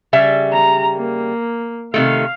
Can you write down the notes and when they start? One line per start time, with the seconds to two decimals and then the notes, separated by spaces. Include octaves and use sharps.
0.13 C#3 G3 E5
0.52 A#5
0.96 A#3
1.94 C3 D#3 A3 F5